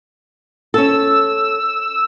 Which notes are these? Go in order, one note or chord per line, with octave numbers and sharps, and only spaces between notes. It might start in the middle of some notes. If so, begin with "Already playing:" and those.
C#4 A4 E6